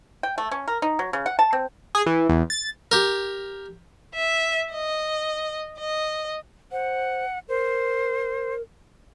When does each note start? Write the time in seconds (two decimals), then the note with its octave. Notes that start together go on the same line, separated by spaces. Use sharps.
0.23 G5
0.38 A3
0.51 C#4
0.68 A#4
0.82 D#4
0.99 F#3
1.13 C#3
1.26 F#5
1.39 A5
1.53 C4
1.95 G#4
2.06 E3
2.29 E2
2.50 A6
2.92 G4 A#4
4.15 E5
4.72 D#5
5.79 D#5
6.72 C5 F#5
7.49 A#4 C5